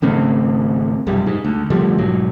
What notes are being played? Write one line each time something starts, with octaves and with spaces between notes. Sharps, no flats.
G#1 C#3 A3 C4
F1 B1 F#2 G3
G#2
D2
D3 F3 G3 A3
B1 G#2 F#3